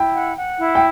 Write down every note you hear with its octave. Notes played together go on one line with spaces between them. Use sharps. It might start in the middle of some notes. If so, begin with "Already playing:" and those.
Already playing: E4 G5
F#5
F#5
E4
G5